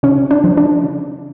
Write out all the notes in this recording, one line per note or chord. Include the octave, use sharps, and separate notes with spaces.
C#3 C#4
D4
F3
D4
C#3